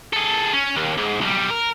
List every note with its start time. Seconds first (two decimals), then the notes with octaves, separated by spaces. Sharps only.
0.13 G#4 A4
0.53 C#4
0.76 D#2
0.97 G#2
1.21 B1 G3
1.50 A#4